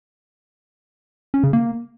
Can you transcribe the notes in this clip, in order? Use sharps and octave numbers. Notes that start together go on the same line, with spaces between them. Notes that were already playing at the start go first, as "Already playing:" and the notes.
C#4
C#3
A#3